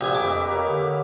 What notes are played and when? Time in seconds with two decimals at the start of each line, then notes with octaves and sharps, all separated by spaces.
0.01 A#1 G4 B4 G#5
0.15 F2 A3 G4 D6
0.27 D#5 E5 B5
0.48 A#3 B4 C#5
0.67 D3